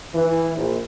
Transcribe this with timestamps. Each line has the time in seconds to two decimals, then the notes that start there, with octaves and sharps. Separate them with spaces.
0.14 E3
0.54 A#1